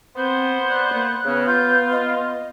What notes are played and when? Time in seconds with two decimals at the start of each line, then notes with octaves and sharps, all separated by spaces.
0.16 B3 C4 C5
0.70 D5 F#6
0.94 A#3
1.25 C#3 B3
1.47 F4 G6
1.91 D#5